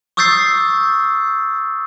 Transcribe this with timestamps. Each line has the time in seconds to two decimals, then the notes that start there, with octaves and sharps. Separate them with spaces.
0.17 C#6 D#6 E6 G6 A6 C7